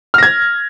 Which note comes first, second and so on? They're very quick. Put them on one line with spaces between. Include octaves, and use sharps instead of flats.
F6 A#6 G#6